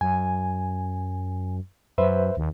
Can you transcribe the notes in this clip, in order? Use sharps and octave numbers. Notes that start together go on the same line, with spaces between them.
F#2 G#5
F#2 B4 C5 E5
D#2